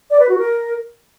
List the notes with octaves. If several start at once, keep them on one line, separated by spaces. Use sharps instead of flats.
D5
B4
F#4
A#4